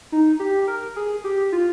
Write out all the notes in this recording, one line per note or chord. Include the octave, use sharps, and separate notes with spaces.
D#4
G4
A#4
G#4
G4
F4